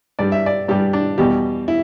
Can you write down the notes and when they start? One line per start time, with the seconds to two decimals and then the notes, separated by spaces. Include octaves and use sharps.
0.19 G2 G3 D5
0.32 E5
0.46 D5
0.68 G2 G3 G4
0.93 D4
1.18 E2 B2 G3 G4
1.68 E4